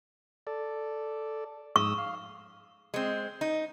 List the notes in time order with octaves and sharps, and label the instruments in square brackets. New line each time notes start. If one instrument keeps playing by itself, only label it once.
[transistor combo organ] A4 D5
[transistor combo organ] G#2 D#6 E6 [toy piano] C#6
[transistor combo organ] F5
[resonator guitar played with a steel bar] G#3 C4
D#4